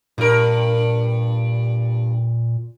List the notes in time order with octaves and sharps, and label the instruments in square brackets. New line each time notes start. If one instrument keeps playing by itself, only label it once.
[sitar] G2 A#4 [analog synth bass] A#2